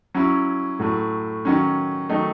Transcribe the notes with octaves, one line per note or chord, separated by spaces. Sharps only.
F#3 C#4 E4
A2 F#3 A3
D#3 F#3 C#4
D#3 F#3 A3 D#4